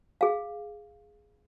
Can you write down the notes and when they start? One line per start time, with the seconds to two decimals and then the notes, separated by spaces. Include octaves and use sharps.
0.21 G#4 F5